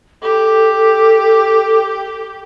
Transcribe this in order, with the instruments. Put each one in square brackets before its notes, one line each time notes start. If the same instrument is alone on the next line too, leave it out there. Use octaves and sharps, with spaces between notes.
[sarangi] G4 [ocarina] A4